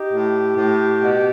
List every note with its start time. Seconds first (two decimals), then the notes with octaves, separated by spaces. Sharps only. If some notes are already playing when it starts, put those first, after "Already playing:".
Already playing: D#4 G4
0.13 A2
0.57 A2
1.02 B2